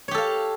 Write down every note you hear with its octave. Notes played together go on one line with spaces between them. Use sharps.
G4 A4 C#5 F5